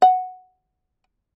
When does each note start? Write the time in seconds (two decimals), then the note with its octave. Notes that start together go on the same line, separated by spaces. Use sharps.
0.02 F#5